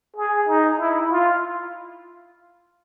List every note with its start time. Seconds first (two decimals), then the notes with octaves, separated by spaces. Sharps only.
0.16 G#4
0.48 D#4
0.79 E4
1.11 F4